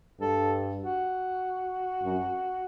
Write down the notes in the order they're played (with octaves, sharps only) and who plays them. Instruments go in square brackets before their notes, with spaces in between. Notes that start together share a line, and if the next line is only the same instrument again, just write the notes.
[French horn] G2 [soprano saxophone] A4
[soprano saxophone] F#4
[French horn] F#2